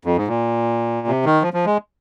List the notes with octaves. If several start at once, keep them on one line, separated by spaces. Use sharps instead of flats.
F2
G#2
A#2
C3
D#3
F3
F3
G#3